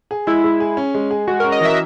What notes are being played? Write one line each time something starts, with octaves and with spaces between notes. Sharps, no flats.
G#4
G#3 E4
G#3
G#4
C#4
G#3
G#4
G#3 F#4
A#4
C#4
D#5
E3 E5